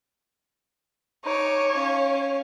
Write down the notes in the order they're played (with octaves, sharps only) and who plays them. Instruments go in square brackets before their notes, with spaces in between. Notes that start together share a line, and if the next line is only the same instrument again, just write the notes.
[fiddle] D#4 D6 [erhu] C#5
[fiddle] C#4 F5